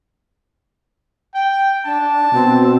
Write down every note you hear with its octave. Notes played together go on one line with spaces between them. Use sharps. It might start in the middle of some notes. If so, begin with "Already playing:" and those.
G5
D4 A5
B2 C4